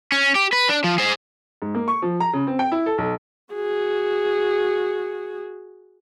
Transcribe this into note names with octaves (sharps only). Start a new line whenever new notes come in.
C#4
G4
B4
D4
F3
G#4 C5
G#2
A#3
C#6
F3
A#5
C#3
C4
G5
E4
A4
B1
F#4 G#4